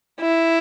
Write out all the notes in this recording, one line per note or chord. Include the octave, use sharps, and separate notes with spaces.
E4